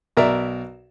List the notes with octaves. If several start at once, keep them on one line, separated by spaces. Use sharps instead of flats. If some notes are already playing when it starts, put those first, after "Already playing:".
B1 A#4 D5 E5